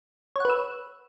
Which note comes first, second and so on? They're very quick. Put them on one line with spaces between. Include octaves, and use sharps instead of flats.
C#5 F#5 B4 E6